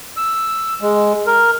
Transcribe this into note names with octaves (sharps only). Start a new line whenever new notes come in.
E6
G#3
A#4